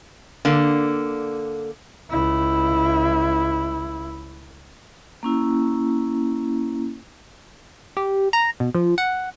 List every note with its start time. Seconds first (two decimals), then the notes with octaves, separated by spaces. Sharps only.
0.45 D3 A#3
2.10 C#2 E4
5.23 A#3 C#4 E4
7.97 G4
8.33 A#5
8.60 B2
8.75 F3
8.98 F#5